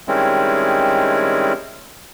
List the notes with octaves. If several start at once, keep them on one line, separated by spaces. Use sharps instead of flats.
D#3 G3 G#3 C4 C#4 E4